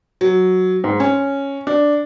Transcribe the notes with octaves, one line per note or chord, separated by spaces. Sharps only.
F#3
G#2
C#4
D4